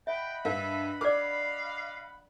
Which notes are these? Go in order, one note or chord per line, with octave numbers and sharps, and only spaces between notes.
D#5 E5 F#5 G5 B5
G2 D4 A#4 E5 F5
A#4 D5 F5 D6 F6